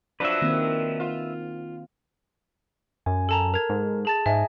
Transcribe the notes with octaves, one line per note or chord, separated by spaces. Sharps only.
F3 F#3 D4 B4 E5
D#3 A#3 C4
F4
F#2 G#5
A4 A5 A#5
A#4 G#6 F7
G#2
G#4 A5 A6
G#2 D#5 E5 G#5